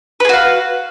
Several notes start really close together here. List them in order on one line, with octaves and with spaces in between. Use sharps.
B4 G#4 F#4 F5